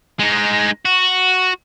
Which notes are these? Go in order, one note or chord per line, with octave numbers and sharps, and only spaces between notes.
G#3 D#4
F#4